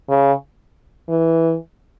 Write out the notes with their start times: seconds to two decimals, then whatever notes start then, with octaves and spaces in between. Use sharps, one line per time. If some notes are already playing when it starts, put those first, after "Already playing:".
0.09 C#3
1.09 E3